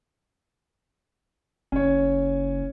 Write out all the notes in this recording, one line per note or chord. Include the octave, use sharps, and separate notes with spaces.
F#1 C#4 C#5